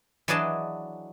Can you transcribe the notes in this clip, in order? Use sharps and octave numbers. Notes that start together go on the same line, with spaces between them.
E3 F#3 D4 G#4 D#5 A5